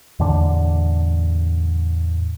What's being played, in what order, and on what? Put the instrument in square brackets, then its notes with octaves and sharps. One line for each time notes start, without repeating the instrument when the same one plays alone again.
[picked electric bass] E2 A2 D3 D4